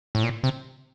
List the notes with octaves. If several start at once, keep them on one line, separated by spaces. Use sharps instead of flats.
A2
A#2
C3